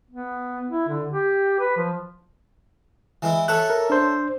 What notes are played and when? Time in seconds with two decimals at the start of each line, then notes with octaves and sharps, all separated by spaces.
0.11 B3
0.70 E4
0.88 D3
1.11 G4
1.60 B4
1.77 F3
3.22 E3 G#3 E4
3.48 A4 C#5 E5 F#6
3.70 A#4
3.90 D4 C5